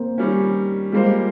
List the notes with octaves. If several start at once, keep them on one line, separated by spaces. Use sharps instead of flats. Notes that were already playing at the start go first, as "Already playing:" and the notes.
Already playing: A#3 C4
D#3 G3 C#4
G3 G#3 A#3 F4 C5